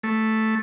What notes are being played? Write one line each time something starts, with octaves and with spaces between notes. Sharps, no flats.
A3